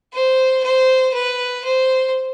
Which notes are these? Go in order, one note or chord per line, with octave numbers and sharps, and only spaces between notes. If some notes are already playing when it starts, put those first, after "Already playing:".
C5
C5
B4
C5